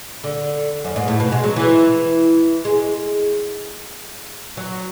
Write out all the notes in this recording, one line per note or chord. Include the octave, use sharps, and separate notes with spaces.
D3
F#2
G#2
A2
B2
G#3
F#3
E3
G#3
F#3